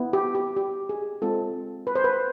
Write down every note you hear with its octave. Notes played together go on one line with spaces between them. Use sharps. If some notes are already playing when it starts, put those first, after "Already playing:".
Already playing: B3 E4
G4
G4
G4
G#4
G#3 C4 F4 A4
B4
C5
B4